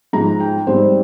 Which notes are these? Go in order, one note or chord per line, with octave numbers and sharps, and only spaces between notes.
G#2 F3 G#3 D#4 A#5
G5
G#2 G3 C4 D#4 C5